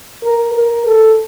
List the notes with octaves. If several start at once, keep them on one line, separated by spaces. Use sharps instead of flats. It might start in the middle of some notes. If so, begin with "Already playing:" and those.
A#4
A#4
A4